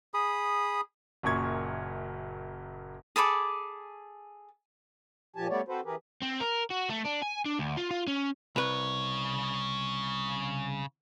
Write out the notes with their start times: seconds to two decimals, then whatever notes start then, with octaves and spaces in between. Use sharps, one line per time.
0.14 G#4 B5 D#6
1.23 F#1 F#2 A#2 C#6 G#6
3.16 G#4 A4 B5 D6
5.36 A#2 F3 G4 G#5 A5
5.49 G3 A3 B3 C#5 D5
5.68 C4 F#4 A4 B4 C5
5.85 E3 G4 G#4 A#4 B4
6.22 C4
6.40 A#4
6.70 F#4
6.90 A3
7.05 D4
7.23 G#5
7.46 D4
7.59 D2
7.77 F4
7.91 F4
8.07 C#4
8.56 C2 C#3 B4 C#5